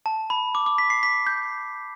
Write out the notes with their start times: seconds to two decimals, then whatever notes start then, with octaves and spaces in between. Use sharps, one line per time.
0.06 A5
0.30 B5
0.55 D6
0.66 D6
0.78 B6
0.90 C7
1.03 B6
1.27 G6